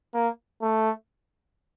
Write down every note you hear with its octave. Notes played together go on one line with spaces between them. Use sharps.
A#3
A3